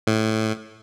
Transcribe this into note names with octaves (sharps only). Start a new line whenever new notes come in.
A2